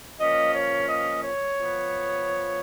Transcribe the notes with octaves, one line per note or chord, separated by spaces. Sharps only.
F3 A#3 C#4 D#5
C#5
D#5
C#5
F3 B3